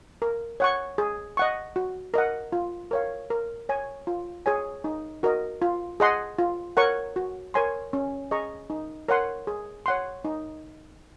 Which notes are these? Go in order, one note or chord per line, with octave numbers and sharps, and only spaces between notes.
A#4
C#5 F#5 C#6
G#4
D#5 F#5 C#6
F#4
A#4 D#5 F#5
F4
A#4 C#5 F5
A#4
C#5 G#5
F4
G#4 C#5 G#5
D#4
F#4 A#4 D#5
F4
G#4 D#5 F#5 C6
F4
A#4 C#5 F#5 C#6
F#4
A#4 C#5 G#5 C6
C#4
G#4 D#5 A#5 C#6
D#4
A#4 C#5 F#5 C6
G#4
C#5 F#5 C6
D#4